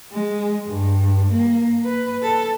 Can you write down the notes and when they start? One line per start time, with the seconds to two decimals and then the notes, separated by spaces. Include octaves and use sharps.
0.12 G#3
0.67 G2
1.32 A#3
1.84 B4
2.22 A4